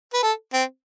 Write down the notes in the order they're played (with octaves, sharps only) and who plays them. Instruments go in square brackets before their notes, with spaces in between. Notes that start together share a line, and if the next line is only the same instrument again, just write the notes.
[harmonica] B4
A4
C4